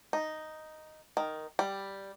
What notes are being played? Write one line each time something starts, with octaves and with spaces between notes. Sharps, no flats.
D#4
D#3
G3